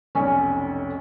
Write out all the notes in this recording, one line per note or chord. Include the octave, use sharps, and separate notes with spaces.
F1 B1 C#4 D5